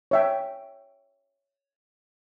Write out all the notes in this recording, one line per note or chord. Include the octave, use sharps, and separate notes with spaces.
C#5 E5 G5